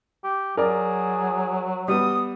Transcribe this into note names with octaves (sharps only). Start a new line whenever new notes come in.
G4
F#3 G#4 A#4 D5
G3 B3 D#6